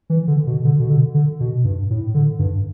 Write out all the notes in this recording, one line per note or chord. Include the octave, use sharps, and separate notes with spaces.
E3
D3
B2
D3
B2
D3
D3
B2
G2
A2
D3
G2